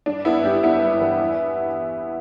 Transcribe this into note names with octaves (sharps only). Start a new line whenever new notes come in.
G2 D4
G1 B3 E4
G2 D4 G4
G1 B3 E4
G2
E3
E2